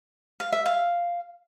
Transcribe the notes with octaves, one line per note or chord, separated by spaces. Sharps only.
F5
E5
F5